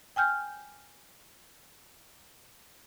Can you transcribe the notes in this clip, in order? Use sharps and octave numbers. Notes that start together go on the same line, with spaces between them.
G5 G#5 F6 G6